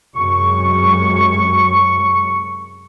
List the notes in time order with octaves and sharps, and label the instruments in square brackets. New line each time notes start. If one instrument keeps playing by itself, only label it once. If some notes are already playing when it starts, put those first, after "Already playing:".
[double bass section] F#2 C3 G#3 [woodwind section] C#6